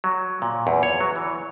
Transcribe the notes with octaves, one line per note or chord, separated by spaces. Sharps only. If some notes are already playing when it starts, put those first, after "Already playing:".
F#3
A#2
E2
C#5
F#3
E3